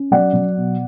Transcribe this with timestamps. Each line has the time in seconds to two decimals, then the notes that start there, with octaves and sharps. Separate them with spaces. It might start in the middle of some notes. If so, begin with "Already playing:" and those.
Already playing: C#4
0.11 F#3 D5 F#5
0.33 F#3
0.56 B2